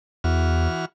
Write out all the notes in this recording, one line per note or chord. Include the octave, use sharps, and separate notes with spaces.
E2 E3 F#4 F6